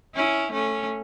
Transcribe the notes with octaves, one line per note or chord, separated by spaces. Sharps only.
C#4 E4
A3 C#4